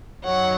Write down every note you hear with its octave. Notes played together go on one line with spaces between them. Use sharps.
F#2 D#3 F#3 C#5 F#5